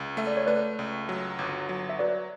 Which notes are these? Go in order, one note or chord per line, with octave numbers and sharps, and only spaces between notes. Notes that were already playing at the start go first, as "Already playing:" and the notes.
Already playing: C#2
A3 E5
D5
C#5
A3 B4 D5
C#2
F#3
G1
F#3
E5
F#3 B4 D5